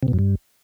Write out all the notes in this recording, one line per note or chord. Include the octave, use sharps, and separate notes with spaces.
C3
B2
F#2
G2